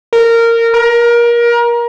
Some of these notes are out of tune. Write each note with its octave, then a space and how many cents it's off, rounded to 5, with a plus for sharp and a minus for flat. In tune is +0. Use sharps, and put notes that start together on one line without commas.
A#4 -15
A#4 +25